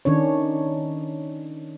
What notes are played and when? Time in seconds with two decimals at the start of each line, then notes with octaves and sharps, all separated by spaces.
0.05 D#3 C#4 D4 C#5